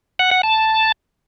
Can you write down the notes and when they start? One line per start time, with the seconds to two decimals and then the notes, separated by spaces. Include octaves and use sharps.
0.19 F#5
0.31 F#5
0.43 A5